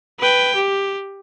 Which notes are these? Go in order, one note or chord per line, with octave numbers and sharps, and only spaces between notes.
B4 G5
G4